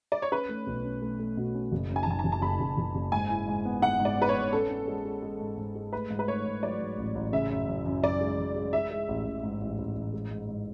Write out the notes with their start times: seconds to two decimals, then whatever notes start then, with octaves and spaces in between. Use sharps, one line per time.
0.12 D5
0.22 C#5
0.32 C#4 B4
0.49 A3
0.67 B1
0.84 C#4
1.02 A3
1.19 A3
1.37 B2
1.55 C#4
1.72 F#1
1.90 F#2
1.96 G#5
2.03 A5
2.07 F#1 G#5
2.19 A5
2.24 F#1
2.32 A5
2.42 F#1 B5
2.60 F#1
2.77 F#1
2.95 F#1
3.12 G#2 G#5
3.30 E4
3.47 G#2
3.65 B3
3.82 B3 F#5
4.00 G#2
4.05 D5
4.18 B3 B4
4.29 C#5
4.35 G#2
4.52 C#4 A4
4.70 C#4
4.88 G#3
5.05 G#3
5.22 G#3
5.40 G#2
5.57 G#2
5.75 G#3
5.93 A3 B4
6.10 G#2
6.19 B4
6.27 A3 C#5
6.45 G#2
6.62 F#3 D5
6.80 G#2
6.98 A1
7.15 A1
7.33 C#3 E5
7.50 F#2
7.68 F#2
7.85 F#2
8.03 F#2 D5
8.21 G#3
8.38 F#2
8.56 G#3
8.73 G#3 E5
8.91 G#3
9.08 A1
9.26 A1
9.43 G#2
9.61 A1
9.78 A1
9.96 A1
10.13 G#3
10.31 G#2
10.48 G#2